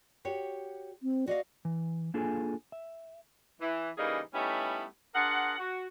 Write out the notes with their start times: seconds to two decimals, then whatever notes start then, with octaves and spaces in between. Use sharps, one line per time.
0.25 F#4 G4 C#5
1.03 C4
1.27 F#4 D5 D#5 F5
1.65 E3
2.14 A#3 D4 F4 G#4 A4 G#5
2.72 E5
3.61 E3
3.98 C#3 E3 G3 A#3 D#4 G#4
4.34 G3 A3 B3 C#4 D#4 E4
5.15 D4 F4 G#4 A#4 F#5
5.59 F#4